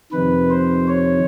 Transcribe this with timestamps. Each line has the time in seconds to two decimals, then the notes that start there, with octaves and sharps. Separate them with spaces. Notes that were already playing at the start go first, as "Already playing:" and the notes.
0.12 F2 C3 D#3 B4
0.50 C5
0.88 C#5